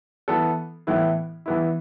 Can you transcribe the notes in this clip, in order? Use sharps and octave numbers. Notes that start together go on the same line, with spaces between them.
E3 B3 A4
A2 E3 B3 E4
E3 B3 E4